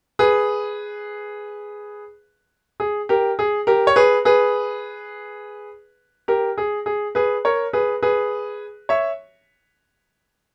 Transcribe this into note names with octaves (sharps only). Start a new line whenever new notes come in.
G#4 B4
G#4
G4 A#4
G#4
G4 A#4
C#5
G#4 B4
G#4 B4
G4 A#4
G#4
G#4
G#4 B4
A#4 C#5
G#4 B4
G#4 B4
C#5 E5